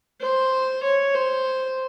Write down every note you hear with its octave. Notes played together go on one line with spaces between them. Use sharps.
C5
C#5
C5